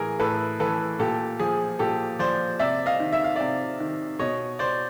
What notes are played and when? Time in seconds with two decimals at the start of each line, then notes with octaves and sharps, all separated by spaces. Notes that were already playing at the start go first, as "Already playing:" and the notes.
Already playing: A2 E3 G#4 A#4
0.20 A2 A4 B4
0.60 E3 A4 B4
0.99 A#2 G4 A4
1.40 F3 G#4
1.79 A#2 G4 A4
2.19 F3 C5 D5
2.59 C3 D5 E5
2.86 D#5 F5
3.00 D#3
3.13 E5
3.24 F5
3.36 C3 D5 E5
3.80 D#3
4.19 B2 C#5 D#5
4.59 C5 D5